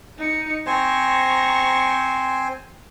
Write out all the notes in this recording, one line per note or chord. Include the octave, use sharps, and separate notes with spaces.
D#4 C#7
C4 C5 G#5 A#5 C#6